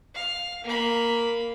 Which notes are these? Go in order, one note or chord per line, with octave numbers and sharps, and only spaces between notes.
F5
A#3 B5